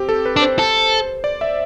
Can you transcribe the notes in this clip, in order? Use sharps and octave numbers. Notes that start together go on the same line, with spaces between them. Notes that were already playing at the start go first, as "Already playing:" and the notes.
Already playing: C4 G4
A4
B4
D4
C5
A4
D5
E5